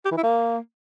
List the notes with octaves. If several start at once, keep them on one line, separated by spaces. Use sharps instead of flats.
G4
E3
E4
A#3